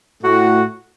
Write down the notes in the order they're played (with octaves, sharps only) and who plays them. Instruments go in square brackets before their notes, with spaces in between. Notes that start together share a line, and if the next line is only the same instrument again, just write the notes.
[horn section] A2 A3 F#4